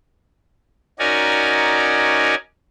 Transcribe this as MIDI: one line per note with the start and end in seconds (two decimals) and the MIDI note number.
0.99 2.35 61
0.99 2.35 63
0.99 2.35 66
0.99 2.35 70
0.99 2.35 74
0.99 2.35 80